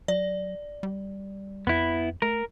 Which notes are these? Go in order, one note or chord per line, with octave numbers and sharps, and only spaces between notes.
F#3 D5
G3
F2 B3 E4
A3 A#4